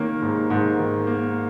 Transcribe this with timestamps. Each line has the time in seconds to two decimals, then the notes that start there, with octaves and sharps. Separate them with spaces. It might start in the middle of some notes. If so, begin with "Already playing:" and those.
Already playing: D#3 A#3 C#5
0.22 G#2
0.50 G#2
0.79 D#3
1.07 A#3